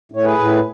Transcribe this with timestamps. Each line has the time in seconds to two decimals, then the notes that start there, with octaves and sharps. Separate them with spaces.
0.12 A2 C#5
0.24 G#4 B4
0.38 A2